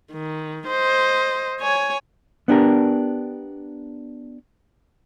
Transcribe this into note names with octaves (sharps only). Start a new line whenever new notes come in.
D#3
C5 D#5
C#5 G#5
B3 D4 G4 A#4